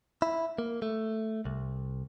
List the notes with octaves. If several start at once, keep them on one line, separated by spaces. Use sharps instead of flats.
E4
A#3
A3
C2